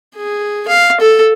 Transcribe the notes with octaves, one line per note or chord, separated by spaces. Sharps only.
G#4
F5
A4